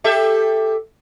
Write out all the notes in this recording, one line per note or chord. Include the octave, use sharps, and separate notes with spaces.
G4 A4 E5